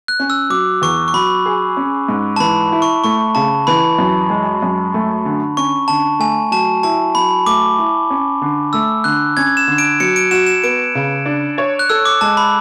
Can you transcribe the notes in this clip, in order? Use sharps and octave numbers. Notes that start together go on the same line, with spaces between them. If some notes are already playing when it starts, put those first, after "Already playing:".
F#6
C#4
E6
F#3 D6
E2 C#6
C#6
F#3 B5
G#4
C#4
G#2
A5
E3 B5
E4
C#6
A3 C#6
C#3 A5
E3 B5
F#2
G#3
F#2
A3
D3
C#4 C#6
D3 A5
A3 G#5
F#3 A5
E4 A5
F#3 B5
A3 D6
E4
C#4
D3
A3 E6
D3 F#6
C#4 G#6
E7
D3
D7
F#3 C#7
D7
F#4 E7
E7
B3 D7
C#3
D4
C#5
F#6
A4 E6
D6
G#3 A5
B5